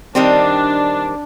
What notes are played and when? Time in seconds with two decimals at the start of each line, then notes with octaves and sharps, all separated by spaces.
0.15 D#3 G3 C4 D4